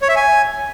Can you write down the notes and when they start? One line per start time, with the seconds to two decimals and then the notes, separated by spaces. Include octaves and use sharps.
0.02 C#5
0.09 E5
0.16 G#5